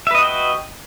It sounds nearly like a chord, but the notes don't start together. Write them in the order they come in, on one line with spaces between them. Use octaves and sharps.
E5 B4 D#5 F#4 G5